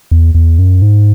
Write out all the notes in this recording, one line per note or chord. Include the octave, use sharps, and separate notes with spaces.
E2
E2
F#2
G#2